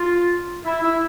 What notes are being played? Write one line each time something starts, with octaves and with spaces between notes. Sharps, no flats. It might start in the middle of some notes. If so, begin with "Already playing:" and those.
Already playing: F4
E4
E4